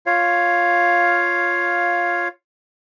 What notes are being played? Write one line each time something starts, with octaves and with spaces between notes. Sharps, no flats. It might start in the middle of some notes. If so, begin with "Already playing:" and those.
F4 C#5 F5